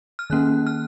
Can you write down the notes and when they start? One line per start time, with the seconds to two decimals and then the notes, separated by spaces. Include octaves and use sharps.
0.19 F6
0.30 D#3 A#3 C#4 F#6
0.67 F6